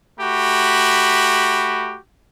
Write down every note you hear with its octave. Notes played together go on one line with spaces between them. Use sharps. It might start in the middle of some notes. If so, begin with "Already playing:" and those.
A3 F#4 G4 B5